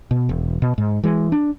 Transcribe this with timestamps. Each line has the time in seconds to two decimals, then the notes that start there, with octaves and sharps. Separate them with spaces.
0.11 B2
0.29 E1
0.62 B2
0.78 G#2
1.04 E3 G#3
1.32 D4